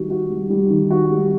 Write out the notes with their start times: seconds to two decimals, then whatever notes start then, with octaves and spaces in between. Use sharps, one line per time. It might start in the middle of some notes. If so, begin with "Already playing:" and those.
Already playing: D#3 G3 F#4
0.10 F#4
0.30 G3
0.50 G3
0.70 D#3
0.91 F#4
1.11 G3